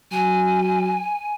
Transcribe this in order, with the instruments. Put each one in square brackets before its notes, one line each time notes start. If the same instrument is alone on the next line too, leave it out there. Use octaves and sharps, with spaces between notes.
[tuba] F#3 [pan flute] G#5